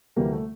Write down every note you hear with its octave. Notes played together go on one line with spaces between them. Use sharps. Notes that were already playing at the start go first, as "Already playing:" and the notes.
D2 C3 E3 G3 A#3
A3